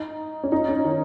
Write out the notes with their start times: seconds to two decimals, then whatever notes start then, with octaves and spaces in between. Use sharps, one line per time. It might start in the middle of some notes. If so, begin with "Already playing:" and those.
Already playing: D#4
0.43 C#4
0.52 D#4
0.69 C#4
0.84 D#3